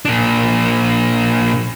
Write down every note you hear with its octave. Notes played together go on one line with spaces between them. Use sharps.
A#2 D4